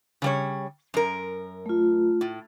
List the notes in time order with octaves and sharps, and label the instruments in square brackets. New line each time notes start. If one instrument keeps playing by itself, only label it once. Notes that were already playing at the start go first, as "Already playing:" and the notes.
[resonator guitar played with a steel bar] C#3 G3 C#5
F#2 A#4
[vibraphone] A3 F4
[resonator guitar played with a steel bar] A2